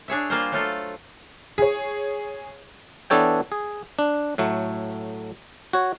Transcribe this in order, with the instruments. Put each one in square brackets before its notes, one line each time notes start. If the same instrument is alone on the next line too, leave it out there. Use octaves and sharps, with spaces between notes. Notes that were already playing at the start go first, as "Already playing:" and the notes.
[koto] D4 G#4 C#5 E5
G3 A#3 F4 G#4 A#4 C5
F#3 A3 F4 A4
[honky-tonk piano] G#4 C#5
[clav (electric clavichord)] E3 B3 D4 A4 C#5 G5
G#4
D4
A2 F#3 A3
F#4 C#5